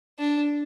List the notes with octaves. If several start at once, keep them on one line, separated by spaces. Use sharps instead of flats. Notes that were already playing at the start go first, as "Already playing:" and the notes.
D4